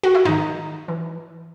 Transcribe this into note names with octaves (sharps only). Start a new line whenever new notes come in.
F#4
E4
G#2 D#3 D#4
E3